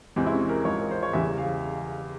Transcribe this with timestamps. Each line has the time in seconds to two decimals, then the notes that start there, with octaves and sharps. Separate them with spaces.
0.16 E2 C3 E3 G#3 C4
0.26 E4
0.32 C#4
0.49 A#4
0.65 G#2 F3 G#3 C#5
0.80 A#4
0.91 C5
1.03 C#5
1.13 E2 C#3 E3 G3 E5
1.38 F5